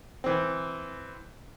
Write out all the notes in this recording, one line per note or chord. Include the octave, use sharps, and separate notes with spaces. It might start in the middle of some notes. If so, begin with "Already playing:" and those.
E3 C4